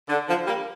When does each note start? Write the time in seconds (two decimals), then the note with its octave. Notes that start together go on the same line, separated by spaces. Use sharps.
0.09 D3
0.28 D3 F3
0.47 G3 A#3